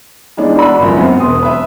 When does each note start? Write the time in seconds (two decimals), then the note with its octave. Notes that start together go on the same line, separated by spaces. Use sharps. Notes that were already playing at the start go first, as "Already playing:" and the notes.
0.37 E3 G#3 B3 D4 D#4
0.55 F#4 B4 D5 B5 E6
0.78 G#1 C#2 F#2
0.97 B3 C4
1.20 E1 C6 D#6
1.43 B4 E5